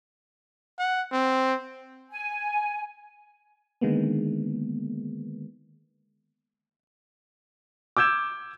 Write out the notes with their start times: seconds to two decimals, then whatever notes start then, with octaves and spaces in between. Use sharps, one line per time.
0.79 F#5
1.12 C4
2.11 G#5
3.81 D3 D#3 G#3 A#3 B3
7.97 D6 E6 G6 G#6 E7